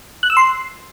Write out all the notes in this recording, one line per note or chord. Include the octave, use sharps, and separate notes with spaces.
F#6
E6
C6